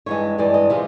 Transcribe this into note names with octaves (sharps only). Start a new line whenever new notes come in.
G2 E3 G#3 C#5
G2 E3 G#3 D5
D#5
C3 F3 G#3